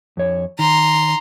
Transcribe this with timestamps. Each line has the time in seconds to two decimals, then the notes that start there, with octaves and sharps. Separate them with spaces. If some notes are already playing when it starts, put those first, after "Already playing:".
0.17 F2 C#5
0.59 D#3 A#5 C6